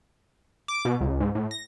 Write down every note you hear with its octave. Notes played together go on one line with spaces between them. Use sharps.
D6
B2
C#2
G#2
A2
A#6